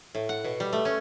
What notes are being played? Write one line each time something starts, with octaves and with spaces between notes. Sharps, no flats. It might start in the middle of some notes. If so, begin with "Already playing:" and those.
A2
F#5
B2
G3
A3
C#4